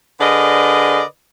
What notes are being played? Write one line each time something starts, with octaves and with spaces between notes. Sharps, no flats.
D3 G#4 A#4 B4 D5 D#5